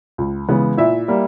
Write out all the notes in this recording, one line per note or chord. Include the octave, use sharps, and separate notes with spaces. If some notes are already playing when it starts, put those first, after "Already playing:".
C#2
C#3 E3 G#3 B3
A#2 E4 E5
G3 A#3